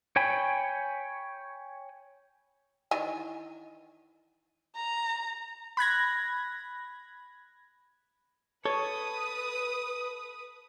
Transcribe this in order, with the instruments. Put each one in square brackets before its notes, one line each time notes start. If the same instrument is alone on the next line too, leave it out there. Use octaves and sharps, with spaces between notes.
[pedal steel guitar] C#5 G5 G#5 B5
[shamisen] D#3 E3 G#5
[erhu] A#5
[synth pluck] B5 F#6 G#6 A#6
[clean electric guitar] A4 [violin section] B4 D#6 [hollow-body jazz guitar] C#5